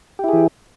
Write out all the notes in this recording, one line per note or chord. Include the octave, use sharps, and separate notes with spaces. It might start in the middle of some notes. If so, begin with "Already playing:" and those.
E3 E4 G4 G#4